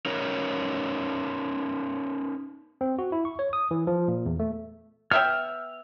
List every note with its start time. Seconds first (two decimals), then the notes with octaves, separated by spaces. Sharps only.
0.06 C#4 D#4 A#4 B4 C#5
2.81 C4
2.99 F#4
3.12 E4
3.25 C#6
3.39 C#5
3.53 D#6
3.71 E3
3.87 F3
4.08 A#2
4.26 E2
4.39 A3
5.11 B3 E5 G5 F6